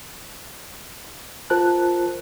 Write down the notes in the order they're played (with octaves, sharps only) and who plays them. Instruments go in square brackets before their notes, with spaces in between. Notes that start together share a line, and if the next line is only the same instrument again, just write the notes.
[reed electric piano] F4 A#4 C5 A5 F#6